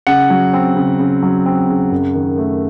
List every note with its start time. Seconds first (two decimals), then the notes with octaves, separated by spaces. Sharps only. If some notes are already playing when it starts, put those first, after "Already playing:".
0.07 C#3 F#5
0.30 F#3
0.53 C4
0.76 C#3
0.99 C#3
1.22 F#3
1.46 C4
1.69 C#3
1.92 F#2
2.15 D#3
2.38 A3